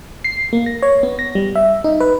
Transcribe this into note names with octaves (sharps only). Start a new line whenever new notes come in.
C7
A#3
A#6
C#5
B3
A#6
G3
E5
D#4
B4